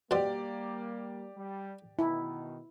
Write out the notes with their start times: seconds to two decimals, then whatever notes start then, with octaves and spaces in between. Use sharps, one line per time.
0.11 B2 G3 A#3 G4 C5 D5 C6
1.37 G3
1.99 B2 D#3 E4